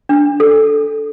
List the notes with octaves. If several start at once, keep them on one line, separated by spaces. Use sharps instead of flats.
D4
A4